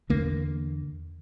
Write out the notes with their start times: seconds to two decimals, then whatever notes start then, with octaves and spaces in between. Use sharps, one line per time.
0.10 E2 D3 A#3